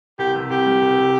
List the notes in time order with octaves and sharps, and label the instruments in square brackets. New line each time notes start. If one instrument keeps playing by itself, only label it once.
[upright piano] C2 [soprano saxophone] G4
[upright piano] C3
[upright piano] C2 [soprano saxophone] G4
[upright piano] G3
C2
C3